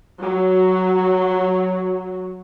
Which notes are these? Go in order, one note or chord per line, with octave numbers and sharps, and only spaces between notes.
F#3 F#4